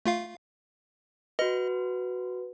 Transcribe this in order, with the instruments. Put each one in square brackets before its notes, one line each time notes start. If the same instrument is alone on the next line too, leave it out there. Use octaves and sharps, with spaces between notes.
[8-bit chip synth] A3 F4 F5
[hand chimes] F#4 B4 [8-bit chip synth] D#5